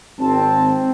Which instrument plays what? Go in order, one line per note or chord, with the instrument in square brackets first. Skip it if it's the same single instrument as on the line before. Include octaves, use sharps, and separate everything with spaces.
[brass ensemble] G#1 A5 [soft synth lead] C4